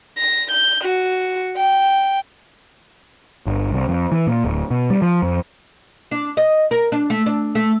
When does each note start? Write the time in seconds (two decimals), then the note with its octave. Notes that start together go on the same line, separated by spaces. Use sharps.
0.18 A#6
0.51 G6
0.84 F#4
1.57 G5
3.47 G1
3.71 C2
3.88 F2
4.12 E3
4.27 A#2
4.45 D1
4.71 B2
4.90 G3
5.02 F3
5.22 F2
6.11 D4
6.37 D#5
6.71 A#4
6.92 D4
7.10 A3
7.26 D4
7.55 A3